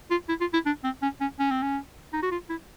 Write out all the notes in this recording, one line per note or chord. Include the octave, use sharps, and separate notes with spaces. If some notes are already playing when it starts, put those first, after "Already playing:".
F4
E4
F4
E4
D4
C4
C#4
C#4
C#4
C4
C#4
D#4
F#4
F4
E4